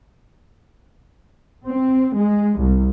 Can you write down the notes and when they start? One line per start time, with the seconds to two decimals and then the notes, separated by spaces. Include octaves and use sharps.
1.68 C4
2.16 G#3
2.58 C2